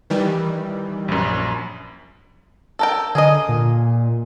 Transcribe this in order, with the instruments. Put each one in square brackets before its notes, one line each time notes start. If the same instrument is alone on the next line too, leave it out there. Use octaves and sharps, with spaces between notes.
[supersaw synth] D#3 E3 G3
[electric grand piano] A#1 F#2
[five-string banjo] A4 A#4 G5
[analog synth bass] D3 [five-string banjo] G#4 A#4 D#5
[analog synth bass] A#2